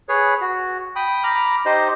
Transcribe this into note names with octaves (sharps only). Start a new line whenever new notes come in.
G#4 B4 C#5
F#4
G5 B5 D#6
A#5 B5 D6 F6
D#4 G4 C5 D#5